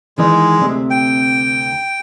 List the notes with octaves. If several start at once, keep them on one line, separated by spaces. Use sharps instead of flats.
D#3 E3 G#3 D#4
D2 C3 C4
G5